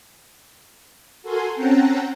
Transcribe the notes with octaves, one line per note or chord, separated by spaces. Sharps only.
F#4 A4 A#4 G#5 C6
C4 C#4 F#5 G5 A5 A#5